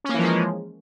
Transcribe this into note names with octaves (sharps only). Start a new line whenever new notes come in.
E3 F3 G#3 A#3 C#4